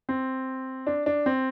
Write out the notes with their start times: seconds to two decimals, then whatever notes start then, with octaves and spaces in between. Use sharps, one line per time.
0.09 C4
0.87 D4
1.06 D4
1.26 C4